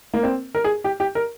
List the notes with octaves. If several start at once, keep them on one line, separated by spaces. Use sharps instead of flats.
A#3
C4
A#4
G#4
G4
G4
A#4